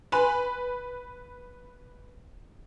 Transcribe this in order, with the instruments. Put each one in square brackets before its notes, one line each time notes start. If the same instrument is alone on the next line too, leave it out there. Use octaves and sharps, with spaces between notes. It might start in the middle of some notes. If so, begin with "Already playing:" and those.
[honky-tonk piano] B4 [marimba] G#5 C6 F#6